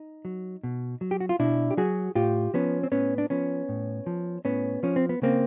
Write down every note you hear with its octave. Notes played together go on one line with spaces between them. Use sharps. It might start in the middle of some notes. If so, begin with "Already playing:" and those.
Already playing: D#4
F#3
B2
F#3
G4
F#4
F4
B2 D4 E4
G4
F#3 F#4 G#4
A2 F4 G4
F3 B3 C#4
C4
A2 B3 C#4
D4
F3 B3 C#4
A2
F3
A2 B3 C#4
F3 C#4
C4
B3
C#3 A#3 C4